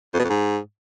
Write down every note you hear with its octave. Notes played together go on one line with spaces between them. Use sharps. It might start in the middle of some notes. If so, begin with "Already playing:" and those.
F2
B2
F2
G#2